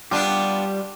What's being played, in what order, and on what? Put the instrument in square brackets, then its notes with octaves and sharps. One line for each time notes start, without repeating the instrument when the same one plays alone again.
[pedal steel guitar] G3 G4 [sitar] B3 D4 F4